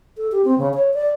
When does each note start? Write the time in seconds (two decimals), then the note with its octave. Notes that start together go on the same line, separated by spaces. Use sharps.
0.17 A4
0.32 G4
0.44 C4
0.58 C#3
0.74 C#5
0.94 D5